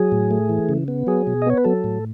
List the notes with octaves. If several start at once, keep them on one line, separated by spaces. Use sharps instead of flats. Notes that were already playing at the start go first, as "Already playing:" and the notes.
Already playing: F#3 G#4
A2
A3
E3
C#3
B3
F#3 G#4
B2
D#5
B3 C#5
B4
F#3 A4
A2